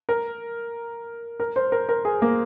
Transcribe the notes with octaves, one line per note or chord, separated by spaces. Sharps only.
A#4
A#4
C5
A#4
A#4
G#4
A#3